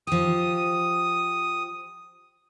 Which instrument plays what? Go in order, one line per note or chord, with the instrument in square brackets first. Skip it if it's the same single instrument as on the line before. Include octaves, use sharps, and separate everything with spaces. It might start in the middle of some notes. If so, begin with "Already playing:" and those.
[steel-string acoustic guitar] F3 G4 [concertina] D#6